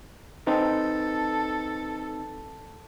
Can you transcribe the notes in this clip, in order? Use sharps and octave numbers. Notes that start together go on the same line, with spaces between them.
C4 D#4 A4 B4